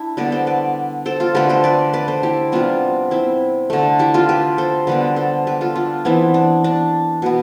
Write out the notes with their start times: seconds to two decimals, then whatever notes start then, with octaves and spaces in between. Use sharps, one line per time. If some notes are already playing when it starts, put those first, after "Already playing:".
Already playing: D4 E4
0.17 D3 G3 B3 B4 D5
0.32 A4 C5
0.47 B4 D5
1.06 A4 C5
1.20 F4 A4
1.35 D3 A3 G4 B4
1.49 A4 C5
1.64 B4 D5
1.93 B4 D5
2.08 A4 C5
2.23 E4 G4
2.52 C3 G3 B3 D4 F4
3.11 C4 E4
3.70 D3 A3
3.99 E4 G4
4.14 F4 A4
4.29 G4 B4
4.58 A4 C5
4.87 D3 G3 B3 B4 D5
5.16 A4 C5
5.47 G4 B4
5.61 F4 A4
5.75 D4 F4
6.05 E3 B3 C4 E4
6.34 D4
6.64 D4
7.22 B2 B3